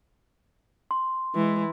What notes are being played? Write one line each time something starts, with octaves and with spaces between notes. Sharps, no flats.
C6
E3 G#3